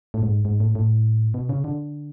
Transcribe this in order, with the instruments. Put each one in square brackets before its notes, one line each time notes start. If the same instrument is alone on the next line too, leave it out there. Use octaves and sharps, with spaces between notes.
[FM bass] A2
G#2
G#2
A2
A2
B2
C#3
D3